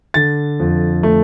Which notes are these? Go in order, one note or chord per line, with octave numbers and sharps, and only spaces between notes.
D3 A6
F2
A3